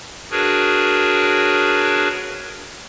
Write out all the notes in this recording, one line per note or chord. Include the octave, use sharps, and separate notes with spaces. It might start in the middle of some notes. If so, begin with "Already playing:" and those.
D4 F#4 G#4 A#4 B4 C#5